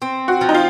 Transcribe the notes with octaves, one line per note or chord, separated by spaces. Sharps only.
C4
F#4
F3
D#4
F4